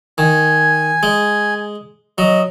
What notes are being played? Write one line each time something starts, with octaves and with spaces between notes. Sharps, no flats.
D#3 G#5
G#3
F#3 D#5